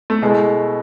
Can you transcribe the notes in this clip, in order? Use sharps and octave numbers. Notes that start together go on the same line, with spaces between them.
A3
B2 G#3 A3 E4